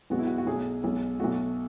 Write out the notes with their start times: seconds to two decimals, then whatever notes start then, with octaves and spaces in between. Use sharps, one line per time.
0.10 B1 B2 G#3 B3 F#4
0.19 E4
0.27 F#4
0.38 F#4
0.47 B1 B2 F#3 A3 G#4
0.84 B1 B2 G#3
1.20 B1 B2 A3 F#4